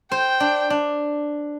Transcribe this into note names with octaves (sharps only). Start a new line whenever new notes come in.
C5 G5
D4
D4